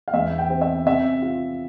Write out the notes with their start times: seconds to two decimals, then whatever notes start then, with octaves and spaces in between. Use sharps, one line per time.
0.08 F5
0.13 E2 E5
0.38 G5
0.50 C4
0.62 E5
0.86 C3 E5
1.22 F4